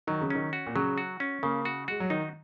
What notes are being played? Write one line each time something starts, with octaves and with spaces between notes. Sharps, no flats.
D#3 F#3
C#3
D#3 C#4
F#4
A#2
C#3 F#3
F#4
C#4
C#3 A#3
F#4
G#3 F#4
F#3
D#3 D#4